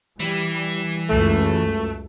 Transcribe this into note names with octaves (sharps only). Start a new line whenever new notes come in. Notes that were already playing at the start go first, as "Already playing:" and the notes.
E3 G3
C#2 F#2 A3